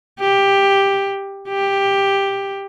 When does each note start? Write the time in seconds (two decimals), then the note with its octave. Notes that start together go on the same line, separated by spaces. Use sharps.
0.20 G4
1.48 G4